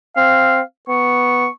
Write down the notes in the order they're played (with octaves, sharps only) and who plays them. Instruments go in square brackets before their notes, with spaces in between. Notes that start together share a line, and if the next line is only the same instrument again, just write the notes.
[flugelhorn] C4 [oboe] F5
[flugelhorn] B3 [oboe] C#6